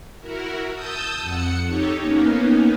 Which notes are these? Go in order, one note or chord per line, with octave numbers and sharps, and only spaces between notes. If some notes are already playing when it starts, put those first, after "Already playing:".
E4 F#4 A#4
A5 D#6 E6 G6
F2 F#5 C#7
D#4 G4 A4 C#5
A#3 B3 C#4 D#4